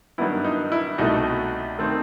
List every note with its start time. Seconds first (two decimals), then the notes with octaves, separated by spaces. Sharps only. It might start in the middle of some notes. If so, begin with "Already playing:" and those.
0.18 G2 D#3 F#3 B3 E4
0.44 D#4
0.72 E4
0.98 C2 B2 A3 D#4 F#4
1.79 D#3 A3 C4